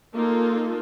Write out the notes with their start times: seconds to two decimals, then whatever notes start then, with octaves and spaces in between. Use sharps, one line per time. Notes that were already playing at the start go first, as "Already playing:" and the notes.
0.14 A#3 D#4 F4 A4